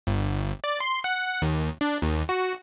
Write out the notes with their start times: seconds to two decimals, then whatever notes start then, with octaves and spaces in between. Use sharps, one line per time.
0.07 G1
0.64 D5
0.80 C6
1.04 F#5
1.42 D#2
1.81 D4
2.02 D#2
2.29 F#4